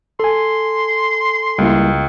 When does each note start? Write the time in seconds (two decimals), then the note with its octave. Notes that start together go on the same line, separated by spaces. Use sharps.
0.20 A4 G#5 C6
1.58 C#2 G3 A#3 E4